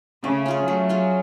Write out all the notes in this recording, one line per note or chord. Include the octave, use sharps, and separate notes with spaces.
C#3 A3
C#4 F4 G#4
F#3 A3
C#4 F4 G#4